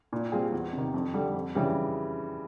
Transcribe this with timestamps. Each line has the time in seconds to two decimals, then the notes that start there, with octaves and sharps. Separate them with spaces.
0.13 A#2
0.32 G3 C4 F4 G#4
0.52 E2
0.73 C3 D#3
0.94 F2
1.14 D3 G3
1.34 F2
1.55 C#3 E3 G3